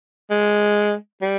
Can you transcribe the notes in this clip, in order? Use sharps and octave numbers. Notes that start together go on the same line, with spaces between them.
G#3
G3